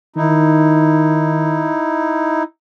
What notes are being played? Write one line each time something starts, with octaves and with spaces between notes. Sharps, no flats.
D#3 D#4 E4